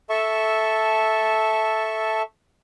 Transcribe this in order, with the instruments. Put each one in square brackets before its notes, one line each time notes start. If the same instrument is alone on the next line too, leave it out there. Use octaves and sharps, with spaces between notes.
[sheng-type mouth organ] A4 E5 A5 C#6